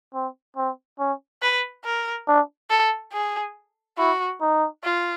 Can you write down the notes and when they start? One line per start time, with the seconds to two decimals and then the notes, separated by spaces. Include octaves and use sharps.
0.14 C4
0.57 C4
0.99 C#4
1.42 B4
1.85 A#4
2.28 D4
2.70 A4
3.13 G#4
3.98 E4 F#4
4.41 D#4
4.84 F4